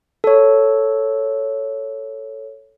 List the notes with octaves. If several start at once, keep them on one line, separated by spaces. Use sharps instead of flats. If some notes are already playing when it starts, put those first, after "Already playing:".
A4 C#5